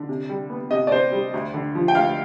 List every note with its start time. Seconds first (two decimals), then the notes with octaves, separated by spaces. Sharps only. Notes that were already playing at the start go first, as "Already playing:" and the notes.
Already playing: D3
0.09 C3
0.29 G3
0.50 B3
0.71 C3 D#5
0.87 D5
0.91 C3 C5
1.12 G3
1.34 D2
1.54 D3
1.75 F3
1.88 G5
1.95 D2 F5